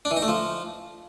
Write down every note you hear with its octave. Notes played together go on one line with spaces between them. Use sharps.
D4
E3
D#4
A3
F3